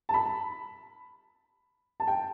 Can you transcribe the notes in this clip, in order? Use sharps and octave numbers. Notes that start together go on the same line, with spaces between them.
A5
B5
A5
G5